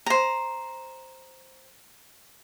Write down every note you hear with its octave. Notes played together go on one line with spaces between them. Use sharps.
C5 A#5